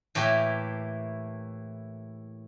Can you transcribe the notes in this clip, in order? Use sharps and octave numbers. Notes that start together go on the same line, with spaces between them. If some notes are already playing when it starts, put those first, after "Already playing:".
A2 E3 A#3 G4